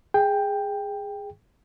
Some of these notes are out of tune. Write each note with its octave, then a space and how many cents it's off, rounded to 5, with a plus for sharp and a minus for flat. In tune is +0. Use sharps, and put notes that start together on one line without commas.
G#4 -10 G5 +10